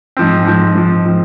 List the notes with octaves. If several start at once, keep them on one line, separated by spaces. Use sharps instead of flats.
G#2 F3 C4
G#2 F3 C4
G#2 F3 C4
F3 C4